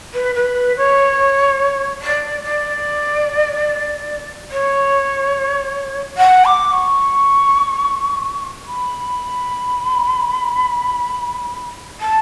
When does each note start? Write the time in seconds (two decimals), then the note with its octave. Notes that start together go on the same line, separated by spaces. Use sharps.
0.13 B4
0.35 B4
0.77 C#5
2.01 D5
2.43 D5
4.51 C#5
6.17 F#5
6.45 D6
6.72 C#6
8.67 B5
12.00 A5